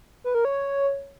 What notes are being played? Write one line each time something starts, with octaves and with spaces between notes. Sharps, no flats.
B4
A#4
C#5